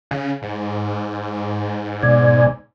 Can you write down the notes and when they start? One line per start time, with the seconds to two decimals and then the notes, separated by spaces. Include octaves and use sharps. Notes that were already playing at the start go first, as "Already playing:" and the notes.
0.11 C#3
0.42 G#2
2.03 B2 D5 G#5